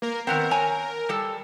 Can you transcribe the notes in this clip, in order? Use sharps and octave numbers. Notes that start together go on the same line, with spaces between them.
A#3 A#4
D#3 B3 C4 A#4
C#5 G#5 A#5
G3 A4